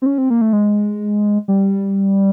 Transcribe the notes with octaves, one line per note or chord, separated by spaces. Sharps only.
C4
C#4
C4
A#3
A3
G#3
G3